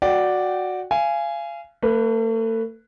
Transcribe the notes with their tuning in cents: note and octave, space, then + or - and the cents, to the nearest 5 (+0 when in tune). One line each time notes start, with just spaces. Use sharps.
F#4 -10 D5 +0 G5 -25
F5 -30 G#5 +0
A3 +40 B4 +0